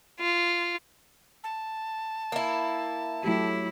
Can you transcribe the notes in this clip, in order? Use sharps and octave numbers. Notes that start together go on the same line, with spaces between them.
F4
A5
A#3 E4
F#3 A3 E4 G4